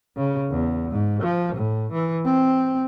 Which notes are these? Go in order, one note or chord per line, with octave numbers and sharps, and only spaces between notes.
C#3
E2
G#2
F3
A2
E3
C4